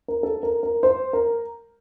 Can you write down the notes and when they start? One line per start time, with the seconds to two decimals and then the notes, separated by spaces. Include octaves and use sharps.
0.08 A#4
0.23 A4
0.43 A#4
0.63 A#4
0.83 C5
1.13 A#4